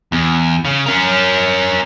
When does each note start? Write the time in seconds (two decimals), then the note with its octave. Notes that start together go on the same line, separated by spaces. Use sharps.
0.12 E2
0.65 C#3
0.86 C#4 A#4